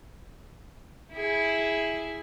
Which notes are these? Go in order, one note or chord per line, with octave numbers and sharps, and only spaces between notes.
E4 G#4